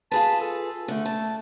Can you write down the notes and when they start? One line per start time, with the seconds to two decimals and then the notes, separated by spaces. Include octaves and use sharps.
0.11 F4 G#4 B4 A5
0.41 A4
0.88 D3 A3
1.05 A5